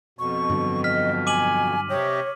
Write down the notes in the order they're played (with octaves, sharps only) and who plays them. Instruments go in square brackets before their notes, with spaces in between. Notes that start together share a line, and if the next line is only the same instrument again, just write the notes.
[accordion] F2 B2 [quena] C#6
[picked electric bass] G2 D3 F#3
[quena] D#5 [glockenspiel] F6 B6
[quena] G#5 [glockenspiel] D6 D#7 F#7
[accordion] C3 G4 D#5 [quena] C#5